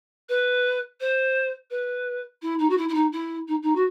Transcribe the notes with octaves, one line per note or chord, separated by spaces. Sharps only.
B4
C5
B4
E4
D#4
F#4
E4
E4
D#4
E4
D#4
D#4
F#4